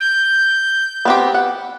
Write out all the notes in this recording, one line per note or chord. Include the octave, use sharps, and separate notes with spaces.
G6
B3 C4 G4
F#5